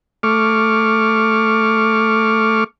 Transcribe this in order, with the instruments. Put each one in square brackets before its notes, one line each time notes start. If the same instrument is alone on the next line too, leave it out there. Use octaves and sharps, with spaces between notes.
[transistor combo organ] A3 C#6 D6 F6